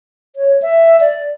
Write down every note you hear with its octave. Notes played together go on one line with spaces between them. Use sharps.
C#5
E5
D5